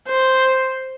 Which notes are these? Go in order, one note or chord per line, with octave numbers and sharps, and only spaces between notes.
C5